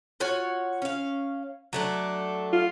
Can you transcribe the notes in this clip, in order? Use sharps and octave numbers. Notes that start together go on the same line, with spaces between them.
F4 F#4 C#5
C#4 F5
F#3 A3 D4
F4